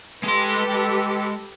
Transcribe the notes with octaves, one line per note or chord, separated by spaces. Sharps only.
G#3 G4 A4 B4 C6